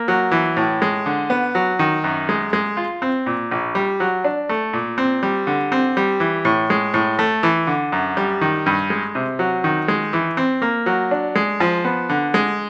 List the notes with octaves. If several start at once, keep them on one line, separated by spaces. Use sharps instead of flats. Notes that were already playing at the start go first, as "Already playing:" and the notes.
Already playing: A#3
F#3
E3
A2
G#3
D3
B3
F#3
D#3
F#2
G#3
G#3
F4
C4
A#2
A#1
G3
F#3
D4
A3
A#2
C4
G3
D3
C4
G3
E3
A2
G#3
A2
A3
E3
D3
F#2
G3
D#3
G2
G#3
C3
F#3
D#3
G#3
E3
C4
A#3
F#3
D4
G#3
F3
B3
D3
G#3